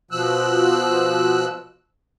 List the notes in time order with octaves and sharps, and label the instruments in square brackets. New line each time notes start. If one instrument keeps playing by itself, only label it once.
[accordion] B2 F3 E6 F#6